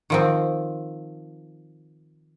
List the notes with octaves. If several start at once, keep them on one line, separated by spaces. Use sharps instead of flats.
D#3 F3 C4